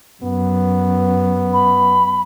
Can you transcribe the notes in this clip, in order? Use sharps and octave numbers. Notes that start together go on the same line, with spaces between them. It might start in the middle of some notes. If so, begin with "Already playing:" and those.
F#2 B3
B5